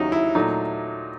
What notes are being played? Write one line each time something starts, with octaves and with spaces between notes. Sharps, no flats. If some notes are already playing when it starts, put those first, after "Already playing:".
Already playing: D#2 C#3 F#3 D#4 E4
E4
A#2 F#3 A3 D#4